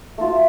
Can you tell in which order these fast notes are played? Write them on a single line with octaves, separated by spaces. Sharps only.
A3 F4 F#4